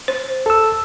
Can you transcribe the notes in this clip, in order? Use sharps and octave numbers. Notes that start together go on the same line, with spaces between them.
C5
A4 E6